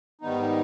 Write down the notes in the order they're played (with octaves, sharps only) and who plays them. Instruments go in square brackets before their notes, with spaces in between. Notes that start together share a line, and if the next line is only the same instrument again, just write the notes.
[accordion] G#2 D#3 G3 B3 D#4